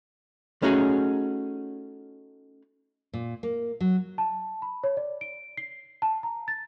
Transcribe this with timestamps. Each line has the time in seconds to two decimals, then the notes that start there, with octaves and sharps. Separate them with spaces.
0.62 A3 C#4 D#4 F#4 G#4
3.13 A#2
3.43 A#3
3.80 F#3
4.18 A5
4.62 B5
4.84 C#5
4.97 D5
5.21 D7
5.57 C7
6.02 A5
6.23 A#5
6.48 A6